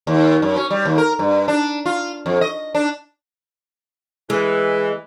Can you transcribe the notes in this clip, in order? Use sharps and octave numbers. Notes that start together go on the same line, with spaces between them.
D#2
F#2
C#4
G3
D#2
A#4
G2
D4
F4
F2
D#5
D4
E3 G#3